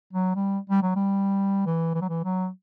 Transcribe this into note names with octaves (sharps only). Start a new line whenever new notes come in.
F#3
G3
G3
F#3
G3
E3
E3
F#3
E3
F#3